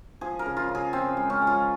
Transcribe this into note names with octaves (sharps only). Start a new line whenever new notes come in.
F3 G#4
A#4
C#3
F4
C#3
G#4
F3 C4
G#3
C#4
G#3
F4